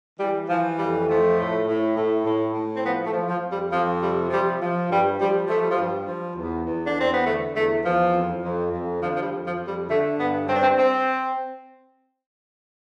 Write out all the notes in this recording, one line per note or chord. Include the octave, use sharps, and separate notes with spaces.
E3 G3
E3 F3
F2 G3
F3 A3
A2
A2
A2
A2
A2
C4
F3 B3
A3
F3
F3
F2
G3
F2 F3
C3 G3
F3 G3
F3
G2 G3
F3 G3
F3 A3
G3
F3
G2 G3
F3
E2
E2
D4
E2 C4
B3
D3 A3
E2 A3
E2 F3
F2
F2
F2
D3 F3
F3
G3
F2
F3
F2
G3
D3 A3
G2 B3
G2 C4
D4
C4
C4